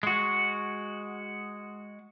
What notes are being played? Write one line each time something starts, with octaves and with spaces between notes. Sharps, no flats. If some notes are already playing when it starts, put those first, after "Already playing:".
G#3 F#4